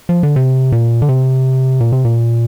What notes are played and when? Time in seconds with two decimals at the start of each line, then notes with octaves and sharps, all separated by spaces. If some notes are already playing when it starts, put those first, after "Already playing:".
0.09 F3
0.23 D3
0.36 C3
0.72 A#2
1.02 D3
1.09 C3
1.80 A#2
1.92 C3
2.05 A#2